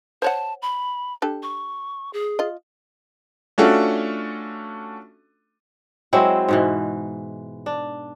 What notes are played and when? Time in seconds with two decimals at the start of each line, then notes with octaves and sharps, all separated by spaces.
0.22 C5 C#5 F#5 A5
0.62 B5
1.22 D4 G4 A4
1.43 C#6
2.13 G#4
2.39 F4 D#5
3.58 A3 C#4 D4 F4 F#4 A4
6.13 F#3 G#3 C4 E4
6.48 G#2 B2 E3
7.66 D4